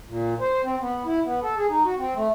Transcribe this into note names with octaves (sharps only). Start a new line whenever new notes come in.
A#2
C5
C4
B3
E4
B3
A4
G#4
D#4
F#4
C4
A3